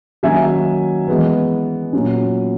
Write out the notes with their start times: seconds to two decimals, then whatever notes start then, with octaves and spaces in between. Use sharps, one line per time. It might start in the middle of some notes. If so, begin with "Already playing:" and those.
0.23 D#3 F#3 A#3 C#4 E5 G#5
1.08 E3 G#3 B3
1.93 A#2 F#3 C#4